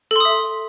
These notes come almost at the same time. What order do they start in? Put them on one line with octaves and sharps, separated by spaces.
A4 C6 D#6 E5